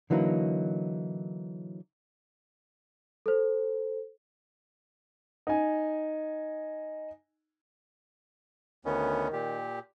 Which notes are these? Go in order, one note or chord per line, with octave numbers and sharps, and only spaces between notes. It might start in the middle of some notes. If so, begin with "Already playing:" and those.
D3 E3 F#3 A#3 D#4
A4 C5
D#4 G#5
D2 D#3 B3 C#4
A#2 G4